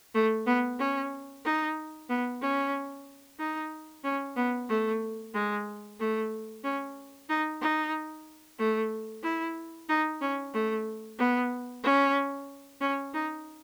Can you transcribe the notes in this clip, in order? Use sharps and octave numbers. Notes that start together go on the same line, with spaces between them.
A3
B3
C#4
D#4
B3
C#4
D#4
C#4
B3
A3
G#3
A3
C#4
D#4
D#4
A3
E4
D#4
C#4
A3
B3
C#4
C#4
D#4